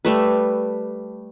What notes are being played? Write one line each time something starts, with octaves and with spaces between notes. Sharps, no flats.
G3 A3 B4